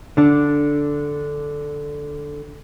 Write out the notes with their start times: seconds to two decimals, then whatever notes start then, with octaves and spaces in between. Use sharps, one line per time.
0.17 D3 D4